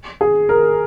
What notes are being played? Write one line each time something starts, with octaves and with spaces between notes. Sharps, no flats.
G#4
A#4